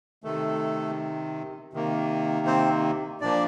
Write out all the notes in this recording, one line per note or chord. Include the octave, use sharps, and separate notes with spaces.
C3 D#3 A3 A4
C3 D#3 A#3
C4 C5
A#2 F3 A#3 D4 D5